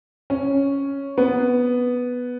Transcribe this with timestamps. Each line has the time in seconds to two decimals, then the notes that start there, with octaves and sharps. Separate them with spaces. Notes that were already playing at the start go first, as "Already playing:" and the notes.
0.30 C#4
1.18 B3